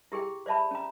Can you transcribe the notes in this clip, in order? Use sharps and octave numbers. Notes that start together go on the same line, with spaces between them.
E4 G4 G#4 G5
C5 D5 E5 A5 B5
C#4 A#5